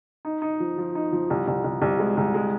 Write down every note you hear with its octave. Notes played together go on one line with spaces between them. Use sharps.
D#4
D#4
F3
F3
D#4
F3
C2
C2
C2
C2
G#3
C2
G#3